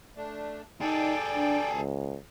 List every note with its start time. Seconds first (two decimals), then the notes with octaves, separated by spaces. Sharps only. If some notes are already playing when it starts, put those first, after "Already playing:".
0.16 A3 D4
0.81 D#4 G#4 A4 D5 G5
1.34 D4
1.72 C#2